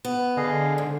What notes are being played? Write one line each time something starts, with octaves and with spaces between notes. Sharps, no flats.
B3
D3 G#4 D#5 F5
G#2